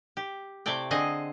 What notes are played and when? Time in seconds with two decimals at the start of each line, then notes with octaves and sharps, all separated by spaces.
0.17 G4
0.66 C3 A3 E4 D5 G5
0.91 D3 C4 G#4 D#5